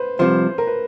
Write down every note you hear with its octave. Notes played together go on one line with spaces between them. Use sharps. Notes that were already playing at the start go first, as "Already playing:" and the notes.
Already playing: B4 C5
C2 C3 F3 C5
A#4
B4